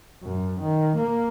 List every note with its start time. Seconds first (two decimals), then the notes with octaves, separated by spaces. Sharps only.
0.23 F#2
0.60 D#3
0.97 A#3